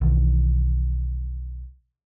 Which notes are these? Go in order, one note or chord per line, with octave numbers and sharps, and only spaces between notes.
B1 D#3 E3